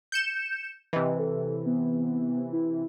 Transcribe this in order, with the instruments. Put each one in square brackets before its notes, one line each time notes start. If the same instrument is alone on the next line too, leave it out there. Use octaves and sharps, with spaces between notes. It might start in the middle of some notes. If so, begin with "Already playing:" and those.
[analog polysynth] G6 C#7 E7
[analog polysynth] C3 E3 [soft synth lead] D#5
[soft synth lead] A4
B3
E4